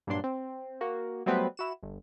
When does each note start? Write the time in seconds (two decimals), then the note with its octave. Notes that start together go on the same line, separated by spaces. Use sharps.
0.07 G2 A#2 F#3 D4 C6
0.24 C4
0.81 A#3 F#4
1.26 F#3 G3 A3 B3 C4 B4
1.57 E4 F#4 E7
1.83 G1